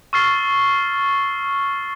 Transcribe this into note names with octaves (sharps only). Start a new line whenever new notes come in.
C#6 E6 F6 A6 C7 G7